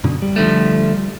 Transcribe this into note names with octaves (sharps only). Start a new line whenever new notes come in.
F#2 B2 D3
G3
D3 F3 A3